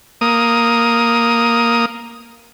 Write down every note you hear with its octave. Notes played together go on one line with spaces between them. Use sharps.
A#3 D#6